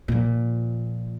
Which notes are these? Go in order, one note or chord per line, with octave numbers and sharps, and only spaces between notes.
A#2 F3